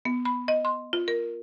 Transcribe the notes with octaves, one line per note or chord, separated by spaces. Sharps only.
B3
B5
D#5
C6
F4
A#4